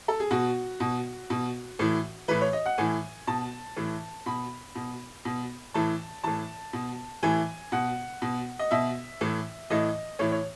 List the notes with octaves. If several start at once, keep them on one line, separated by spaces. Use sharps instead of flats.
A4
G#4
B2 F#4
B2
B2
A2 E3
A2 E3 B4
C#5
D#5
F#5
A2 E3 G#5
B2 A5
A2 E3
B2 B5
B2
B2
A2 E3 A5
A2 E3 A5
B2
A2 E3 G#5
B2 F#5
B2
D#5
B2 E5
A2 E3
A2 E3 D#5
A2 E3 C#5
C#5